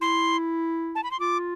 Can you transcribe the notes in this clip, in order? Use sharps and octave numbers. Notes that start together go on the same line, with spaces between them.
E4 C6
A5
B5
C6
F4 D6